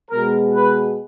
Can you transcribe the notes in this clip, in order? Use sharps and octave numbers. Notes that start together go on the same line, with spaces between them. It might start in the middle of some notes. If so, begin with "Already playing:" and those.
B2 G#3 A#4
B4